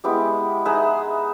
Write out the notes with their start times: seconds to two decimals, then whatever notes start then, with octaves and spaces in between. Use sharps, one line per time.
0.04 G#3 B3 E4 G4
0.65 D#4 G#4 B4 E5